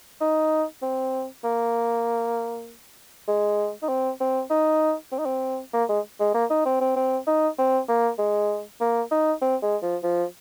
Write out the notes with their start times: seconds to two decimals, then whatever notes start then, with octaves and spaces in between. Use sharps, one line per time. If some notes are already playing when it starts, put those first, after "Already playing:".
0.21 D#4
0.82 C4
1.44 A#3
3.28 G#3
3.83 D#4
3.89 C4
4.20 C4
4.50 D#4
5.12 C4
5.19 D#4
5.26 C4
5.73 A#3
5.89 G#3
6.20 G#3
6.34 A#3
6.50 D#4
6.65 C4
6.81 C4
6.96 C4
7.27 D#4
7.58 C4
7.89 A#3
8.19 G#3
8.81 A#3
9.11 D#4
9.42 C4
9.62 G#3
9.82 F3
10.03 F3